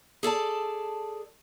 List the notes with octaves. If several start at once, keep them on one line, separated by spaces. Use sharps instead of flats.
G#4 A4 D5 A5